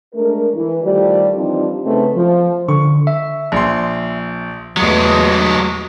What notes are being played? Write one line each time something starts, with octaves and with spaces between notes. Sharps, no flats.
G#3 A3 D4 A#4
E3
D#3 F3 G3 A3 D5
E3 F3 G3 C4 D4 D#4
C#3 A3 B3 C4 D#4
F3
D3 C#6
E5
A#1 C6
E2 F#3 G#3 A3